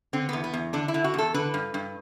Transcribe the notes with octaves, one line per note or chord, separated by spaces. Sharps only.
D3 C4
E2 B3
B3
E2
D3 D4
E4
D3
F#4
E2 A4
D3 B4
G2
G2